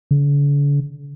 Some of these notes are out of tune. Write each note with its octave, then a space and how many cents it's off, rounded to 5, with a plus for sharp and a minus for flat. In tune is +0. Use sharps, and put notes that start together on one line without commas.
D3 -45